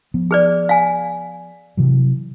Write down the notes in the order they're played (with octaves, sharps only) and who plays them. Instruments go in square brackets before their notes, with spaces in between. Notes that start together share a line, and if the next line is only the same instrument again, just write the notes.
[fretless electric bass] F3 B3
[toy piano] G#4 B4 D5
F5 G#5
[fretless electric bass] C3 E3 F#3